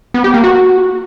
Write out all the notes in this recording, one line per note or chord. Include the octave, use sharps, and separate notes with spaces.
B3
G4
A#3
F#4